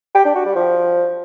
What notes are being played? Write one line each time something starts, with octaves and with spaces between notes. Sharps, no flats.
G4
D4
F#4
G3
F3